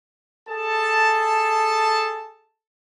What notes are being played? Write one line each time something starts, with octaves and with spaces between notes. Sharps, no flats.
G#4 A4 A5